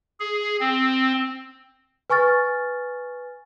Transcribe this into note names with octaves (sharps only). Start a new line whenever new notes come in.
G#4
C4
B4 G#5 C#6 F6 A6